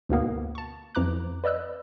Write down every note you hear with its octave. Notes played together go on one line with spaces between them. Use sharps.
D2 G#2 B2 A#3 B3
A5 C#6
F2 E3 A#5 D6 F#6
B4 D5 D#5 E6 F#6